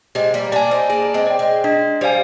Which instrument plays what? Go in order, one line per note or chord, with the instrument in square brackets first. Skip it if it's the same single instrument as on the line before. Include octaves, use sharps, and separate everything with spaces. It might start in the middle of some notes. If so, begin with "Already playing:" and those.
[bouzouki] G#3 C4 [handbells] G4
[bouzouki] G3 A#3
[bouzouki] A#3 D4 [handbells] D5 G#5
[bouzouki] C4 D#4
[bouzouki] A#3 D4 [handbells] G#4
[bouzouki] G#3 C4
[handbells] D5 G5
[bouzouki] G#3 C4
[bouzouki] G#3 [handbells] D4
[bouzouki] G3 [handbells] G4 C5 F5 G#5